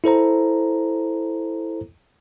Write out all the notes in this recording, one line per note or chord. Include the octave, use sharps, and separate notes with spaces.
E4 A4 C5 A#5